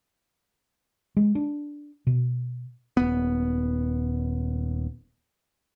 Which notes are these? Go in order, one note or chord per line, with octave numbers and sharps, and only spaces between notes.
G#3
D4
B2
D#1 B3